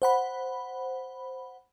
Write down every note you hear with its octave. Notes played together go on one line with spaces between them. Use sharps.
C5 F#5 B5